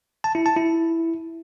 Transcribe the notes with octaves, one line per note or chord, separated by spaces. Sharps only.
A5
E4
A5
E4